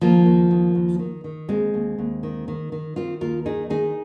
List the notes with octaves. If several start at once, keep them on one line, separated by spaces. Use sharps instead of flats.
D#2 F3 A#3
D#2
D#2
D#2
D#3
D#3
D#2 G#3 C4
D#2
D#2
D#3
D#3
D#3
D#3 C4 F4
D#2 F4 A#4
D#3 D#4 G#4
D#3 D#4 G#4